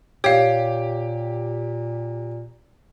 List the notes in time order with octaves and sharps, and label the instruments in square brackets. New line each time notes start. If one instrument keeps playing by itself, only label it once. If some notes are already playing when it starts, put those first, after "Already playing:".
[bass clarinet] A#2 [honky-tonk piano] G4 [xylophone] C#5 F5